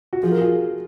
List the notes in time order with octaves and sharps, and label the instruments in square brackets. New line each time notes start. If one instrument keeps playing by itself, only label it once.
[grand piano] F#4
[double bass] F3 [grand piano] F4 G#4
[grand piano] F#4 A#4
F4 G#4